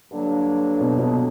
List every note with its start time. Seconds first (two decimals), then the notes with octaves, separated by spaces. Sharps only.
0.11 G2 D3 F#3 A#3 D4
0.81 B2
0.99 B2